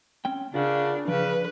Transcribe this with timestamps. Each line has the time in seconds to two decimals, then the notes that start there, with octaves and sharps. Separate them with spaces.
0.25 C4 C#4 G5
0.54 C#3 D4 F4 A#4 F#5
1.08 C#3 F3 D4 B4 D5